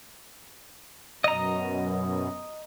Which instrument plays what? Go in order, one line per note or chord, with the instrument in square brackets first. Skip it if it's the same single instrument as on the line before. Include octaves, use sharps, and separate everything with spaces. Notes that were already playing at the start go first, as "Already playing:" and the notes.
[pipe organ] F#2 B2 [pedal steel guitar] D#5 A#5